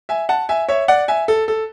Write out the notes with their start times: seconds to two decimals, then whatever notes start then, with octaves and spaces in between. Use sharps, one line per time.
0.09 E5 G#5
0.29 F#5 A5
0.49 E5 G#5
0.68 C#5 E5
0.88 D5 F#5
1.08 E5 G#5
1.28 A4
1.48 A4